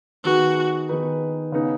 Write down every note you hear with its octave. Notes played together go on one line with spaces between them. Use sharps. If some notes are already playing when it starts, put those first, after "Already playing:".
D#3 B3 D#4 F#4 G#4 B4
D#3 B3 D#4 G#4 B4
C#3 B3 D#4